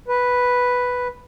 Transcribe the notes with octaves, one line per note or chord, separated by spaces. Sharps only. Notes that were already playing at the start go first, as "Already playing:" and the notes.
B4